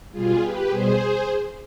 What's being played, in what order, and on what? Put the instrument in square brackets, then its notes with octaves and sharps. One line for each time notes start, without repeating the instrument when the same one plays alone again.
[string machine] B2 G3 F4 G#4
G4 B4
B2 G3 G#4 C5